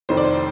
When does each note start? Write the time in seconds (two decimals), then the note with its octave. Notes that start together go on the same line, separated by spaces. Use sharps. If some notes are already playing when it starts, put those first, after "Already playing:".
0.09 F1 F2 D#3 C5
0.17 D5
0.25 C5